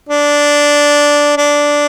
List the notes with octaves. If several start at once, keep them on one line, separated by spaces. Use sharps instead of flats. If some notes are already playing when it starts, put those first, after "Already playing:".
D4
D4